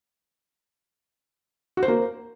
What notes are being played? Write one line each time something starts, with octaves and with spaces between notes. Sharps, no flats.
F#4
C5
A#3